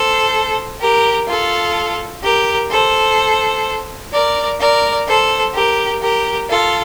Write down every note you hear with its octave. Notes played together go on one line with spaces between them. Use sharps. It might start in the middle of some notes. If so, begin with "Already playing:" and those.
Already playing: A4 C5
G4 A#4
F4 A4
G4 A#4
A4 C5
A#4 D5
A#4 D5
A4 C5
G4 A#4
G4 A#4
F4 A4